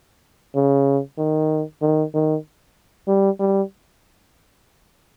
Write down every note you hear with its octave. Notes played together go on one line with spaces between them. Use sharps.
C#3
D#3
D#3
D#3
G3
G3